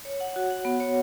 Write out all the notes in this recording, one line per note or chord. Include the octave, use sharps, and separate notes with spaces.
C#5
F#5
F#4
F#5
B3
C#5